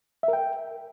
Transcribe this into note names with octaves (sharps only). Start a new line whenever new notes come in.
E5
A#4
G5